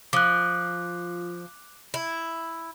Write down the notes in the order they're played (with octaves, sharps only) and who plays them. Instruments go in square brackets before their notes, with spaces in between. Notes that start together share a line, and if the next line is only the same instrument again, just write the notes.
[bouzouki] F3 [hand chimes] D6 F#6
[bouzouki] E4